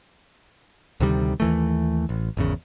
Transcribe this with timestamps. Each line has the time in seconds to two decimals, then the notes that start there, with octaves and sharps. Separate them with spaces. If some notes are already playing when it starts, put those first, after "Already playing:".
1.00 D2 C3 D#3 G3
1.40 D#2 E3 A3
2.09 A1
2.37 G#1 E2 C#3